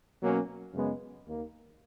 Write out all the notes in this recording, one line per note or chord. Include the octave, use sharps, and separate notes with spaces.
B2 F#3 A#3 C#4
F#2 C#3 G#3 B3
D#2 D#3 A#3